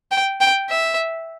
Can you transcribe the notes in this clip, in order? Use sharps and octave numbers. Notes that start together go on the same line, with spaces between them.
G5
G5
E5